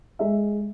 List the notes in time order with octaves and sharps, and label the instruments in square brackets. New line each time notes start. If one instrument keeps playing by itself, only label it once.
[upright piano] G#3 E5